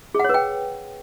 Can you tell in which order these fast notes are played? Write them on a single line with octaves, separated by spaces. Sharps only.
G#4 F#5 C#5 B4 G5